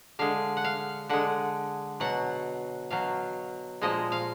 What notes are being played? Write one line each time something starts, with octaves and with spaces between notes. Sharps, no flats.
D3 G#3 F5
F#5
F5
D3 G#3 F#5
B2 F#3 F#5
B2 F#3 F5
A#2 F3 G#3 D#5
F5